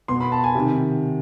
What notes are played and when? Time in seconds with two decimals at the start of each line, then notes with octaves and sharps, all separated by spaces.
0.08 B2 C6
0.20 B5
0.32 A5
0.44 G#5
0.55 C3 D#3